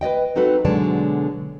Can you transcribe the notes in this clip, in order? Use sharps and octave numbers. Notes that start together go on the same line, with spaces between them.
B4 D5 D#5 G5
C4 D#4 F#4 A4 B4
B2 D3 F#3 G#3 D5 A5